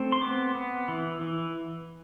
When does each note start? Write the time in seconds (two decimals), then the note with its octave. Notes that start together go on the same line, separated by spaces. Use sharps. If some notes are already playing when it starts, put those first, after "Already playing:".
Already playing: A3 C4
0.12 C6
0.21 B3 D6
0.55 B3
0.88 E3
1.21 E3